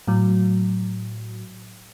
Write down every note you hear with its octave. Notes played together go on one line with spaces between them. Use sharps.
A2 F#3